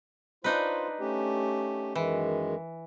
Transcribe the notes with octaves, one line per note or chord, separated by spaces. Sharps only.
D4 D#4 F4 B4 C5
A3 C#4 G4
F#2 D#3 E3 G#3